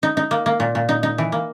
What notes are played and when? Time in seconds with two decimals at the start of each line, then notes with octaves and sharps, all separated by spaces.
0.03 D#4
0.17 D#4
0.31 A#3
0.46 A#3
0.60 A#2
0.75 A#2
0.89 D#4
1.03 D#4
1.18 E3
1.32 A#3